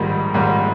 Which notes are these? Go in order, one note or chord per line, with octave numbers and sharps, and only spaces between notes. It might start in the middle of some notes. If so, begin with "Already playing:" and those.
Already playing: A#1 G#2 D#3 G3
A#1 G#2 D#3 G3